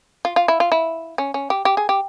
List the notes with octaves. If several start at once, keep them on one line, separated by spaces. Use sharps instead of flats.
F4
F4
E4
F4
E4
C#4
C#4
G4
G4
G#4
G4